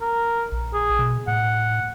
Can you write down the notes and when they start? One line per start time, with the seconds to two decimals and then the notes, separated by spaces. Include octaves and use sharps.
0.02 A#4
0.52 A#1
0.74 G#4
0.99 B2
1.28 A2 F#5